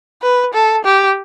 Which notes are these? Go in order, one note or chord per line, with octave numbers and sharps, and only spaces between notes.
B4
A4
G4